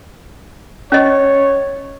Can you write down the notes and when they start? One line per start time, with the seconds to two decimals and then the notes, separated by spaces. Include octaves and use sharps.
0.92 C#4 C#5 D#5